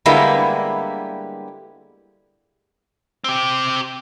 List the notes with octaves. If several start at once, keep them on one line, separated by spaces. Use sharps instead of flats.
D3 G3 G#3 A#3 B3 E4
C4 G4